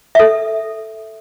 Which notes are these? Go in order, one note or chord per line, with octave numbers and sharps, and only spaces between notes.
A4 E5